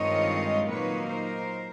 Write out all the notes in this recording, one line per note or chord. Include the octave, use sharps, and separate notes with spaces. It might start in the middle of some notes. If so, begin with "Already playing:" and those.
Already playing: G2 D#3 G#3 C4 F4 C#5 D#5
A#2 F#3 A#3 D#4 B4 C#5
A#4 C5